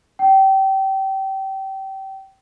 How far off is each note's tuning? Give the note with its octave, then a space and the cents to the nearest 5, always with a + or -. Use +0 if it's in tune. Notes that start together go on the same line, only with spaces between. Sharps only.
G5 -25